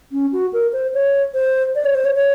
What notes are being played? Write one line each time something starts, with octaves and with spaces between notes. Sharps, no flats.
C#4
F#4
A#4
C5
C#5
C5
D5
C#5
C5
C#5
C#5